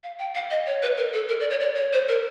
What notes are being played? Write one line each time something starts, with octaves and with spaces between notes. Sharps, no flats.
F5
G5
F5
D#5
C#5
B4
A#4
A4
A#4
D5
C#5
D5
C#5
C5
A#4